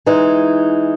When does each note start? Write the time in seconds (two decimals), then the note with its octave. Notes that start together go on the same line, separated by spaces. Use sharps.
0.06 E3 G#3 D#4